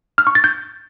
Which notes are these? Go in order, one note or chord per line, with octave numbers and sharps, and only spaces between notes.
F6
C#6
A6
G6